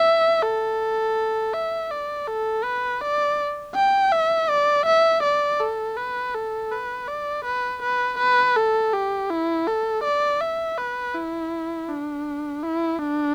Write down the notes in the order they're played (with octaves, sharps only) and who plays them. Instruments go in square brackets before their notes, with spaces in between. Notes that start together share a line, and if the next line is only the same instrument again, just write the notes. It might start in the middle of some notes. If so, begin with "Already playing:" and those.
Already playing: [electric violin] E5
A4
E5
D5
A4
B4
D5
G5
E5
D5
E5
D5
A4
B4
A4
B4
D5
B4
B4
B4
A4
G4
E4
A4
D5
E5
B4
E4
D4
E4
D4